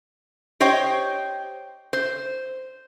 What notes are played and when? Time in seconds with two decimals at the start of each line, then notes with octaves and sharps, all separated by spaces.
0.60 G4 C5 C#5 D#5 G5
1.93 C5